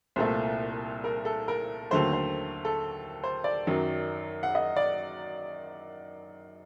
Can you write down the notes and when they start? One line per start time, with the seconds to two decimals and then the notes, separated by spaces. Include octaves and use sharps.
0.16 C2 A#2 A3 C5
1.04 A#4
1.25 A4
1.48 A#4
1.91 D#2 D3 F#3 A3 C5
2.13 C5
2.65 A4
3.24 C5
3.44 D5
3.67 F#2 D#3 F#3
4.43 F#5
4.55 D#5
4.76 D5